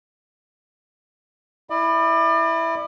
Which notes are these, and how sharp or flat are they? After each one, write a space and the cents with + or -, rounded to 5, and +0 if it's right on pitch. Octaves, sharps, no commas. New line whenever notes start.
E4 +0 D5 +40